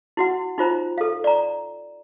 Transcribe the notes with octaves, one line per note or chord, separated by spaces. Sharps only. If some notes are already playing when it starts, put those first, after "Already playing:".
E4 F#4 F#5
D#4 F4 C5 A#5
A4 F5
D5 A#5